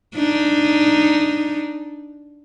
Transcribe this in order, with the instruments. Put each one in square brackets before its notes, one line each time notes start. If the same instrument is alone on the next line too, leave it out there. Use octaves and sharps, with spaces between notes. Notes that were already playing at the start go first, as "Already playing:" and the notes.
[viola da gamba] D4 D#4